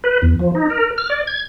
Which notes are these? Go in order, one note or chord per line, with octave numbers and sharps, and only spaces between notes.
B4
E2
F3
D#4
A#4
F6
D5
G#6